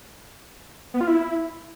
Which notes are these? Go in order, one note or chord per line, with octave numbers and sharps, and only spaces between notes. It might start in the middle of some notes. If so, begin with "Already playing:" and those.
B3
F4
E4